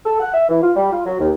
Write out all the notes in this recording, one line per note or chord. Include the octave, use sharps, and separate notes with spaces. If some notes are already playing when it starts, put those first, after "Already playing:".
A4
F#5
E5
E3
F4
G3
F4
F#3
D#2